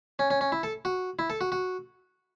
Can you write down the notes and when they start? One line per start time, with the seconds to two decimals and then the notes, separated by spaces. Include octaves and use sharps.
0.19 C#4
0.30 C#4
0.41 C#4
0.52 E4
0.63 A4
0.85 F#4
1.19 E4
1.30 A4
1.41 F#4
1.52 F#4